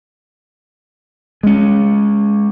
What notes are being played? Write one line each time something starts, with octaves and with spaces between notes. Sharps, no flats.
G#3 C#4